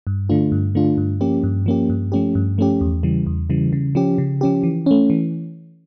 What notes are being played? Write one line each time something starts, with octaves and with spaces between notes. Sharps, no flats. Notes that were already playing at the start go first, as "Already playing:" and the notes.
G2
D3 A3 D4 F4
G2
D3 A3 D4 F4
G2
F3 A#3 C#4 G4
G2
F3 A#3 C#4 G4
G2
F3 A3 C#4 G4
G2
F3 A3 C#4 G4
E2
C#3 E3 G3
E2
C#3 E3 G3
C#3
F3 C#4 G4
C#3
F3 C#4 G4
E3
A3 C#4
E3